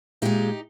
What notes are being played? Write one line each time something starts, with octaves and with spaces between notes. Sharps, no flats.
A#2 G#3 D#4 G4